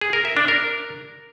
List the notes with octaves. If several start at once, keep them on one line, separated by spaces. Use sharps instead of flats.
G#4
A#4
E5
D4
A#4